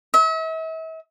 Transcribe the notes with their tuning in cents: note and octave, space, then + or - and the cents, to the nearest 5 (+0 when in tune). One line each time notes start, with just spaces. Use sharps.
E5 -40